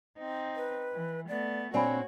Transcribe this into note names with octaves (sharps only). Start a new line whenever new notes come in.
C4 D#4
B4
E3
A3 B3 D5
A#2 C4 D4 F#4 C#5 D5 G#5 B5